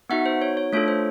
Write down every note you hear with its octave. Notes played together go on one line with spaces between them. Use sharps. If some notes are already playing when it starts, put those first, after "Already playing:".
B3 D#4 F#4 E5 F#5
C5
C#5
C#5
A3 D4 F4 A4 C#5
C5